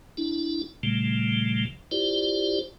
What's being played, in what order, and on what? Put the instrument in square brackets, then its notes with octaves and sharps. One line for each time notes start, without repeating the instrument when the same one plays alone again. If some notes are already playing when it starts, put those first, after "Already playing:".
[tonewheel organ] D4 E4
A#2 C#3 F3 G3 A3
E4 F4 G4 C5 D5